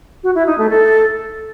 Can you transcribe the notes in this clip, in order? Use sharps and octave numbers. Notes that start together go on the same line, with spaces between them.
F#4
E4
D#4
A3
A4